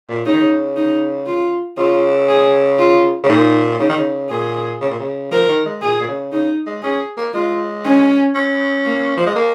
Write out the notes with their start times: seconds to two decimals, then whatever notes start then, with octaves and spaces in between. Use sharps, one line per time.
0.09 A#2
0.26 C#3 D#4
0.33 D#3
0.40 C#3
0.76 D#4
1.26 F4
1.77 C#3 F4
2.28 G#4
2.78 F4
3.23 C#3
3.29 A#2 D#4
3.79 C#3 D#4
3.89 D#3
3.97 C#3
4.30 A#2 G#4
4.81 C#3
4.90 A#2
4.99 C#3
5.31 F3 A#4
5.48 D#3
5.65 G#3
5.82 A#2 G#4
6.00 A#2
6.08 C#3
6.32 C#3 D#4
6.66 G#3
6.83 C#4 G#4
7.17 A#3
7.34 G#3 F4
7.84 C#4
8.35 C#4
8.85 A#3
9.17 F3
9.26 G#3
9.35 A#3